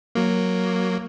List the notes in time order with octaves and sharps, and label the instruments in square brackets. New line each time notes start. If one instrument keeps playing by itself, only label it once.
[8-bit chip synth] F#3 A#3